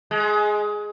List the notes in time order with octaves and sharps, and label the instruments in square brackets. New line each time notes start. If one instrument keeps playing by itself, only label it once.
[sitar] G#3